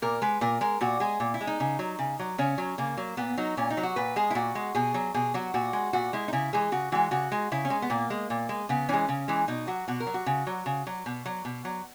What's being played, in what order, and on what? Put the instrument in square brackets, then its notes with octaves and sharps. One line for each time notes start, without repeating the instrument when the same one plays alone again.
[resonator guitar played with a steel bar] A#2 A#4
G#3 B4
A#2 A#4
G#3 A#4
A#2 F#4
G#3 G#4
A#2
E4
G#3
D#4
C#3
F#3
C#3
F#3
C#3 C#4
F#3
C#3 A#3
F#3
A#2 B3
F#3 D#4
A#2 C#4
D#4
F#3
F#4
A#2 B4
G#3 G#4
E4
A#2 F#4
G#3
B2 G#4
F#3
B2 G#4
F#3 F#4
A#2 F#4
G#3
A#2 F#4
G#3 E4
D#4
C#3 E4
E3 G#3 G#4
C#3 F#4
E3 G#3 F#4
C#3 F#4
G#3
C#3 E4
C#4
G#3
B3
A#2 A#3
G#3
A#2
G#3
C#3 B3
E3 G#3 C#4
C#3
E3 G#3
B2 D#4
F#3 F#4
B2 F#4
A#4
F#3
F#4
C#3
F#3
C#3
F#3
B2
F#3
B2
F#3